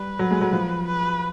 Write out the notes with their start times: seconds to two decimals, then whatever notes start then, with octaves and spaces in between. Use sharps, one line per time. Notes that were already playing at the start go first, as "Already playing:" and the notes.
Already playing: G3 B4
0.19 F#3
0.31 G#3
0.41 F#3
0.53 F3
0.87 B4